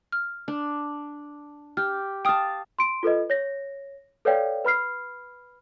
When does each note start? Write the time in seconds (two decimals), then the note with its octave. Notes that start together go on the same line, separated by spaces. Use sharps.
0.12 F6
0.48 D4
1.77 G4 F6
2.25 F5 G5 A5 D#6 F6
2.79 C6 D7
3.03 F4 A4 B4 D#5
3.30 C#5 A#6
4.25 A4 B4 C#5 D5 F5 G5
4.65 B4 B5 F6 C7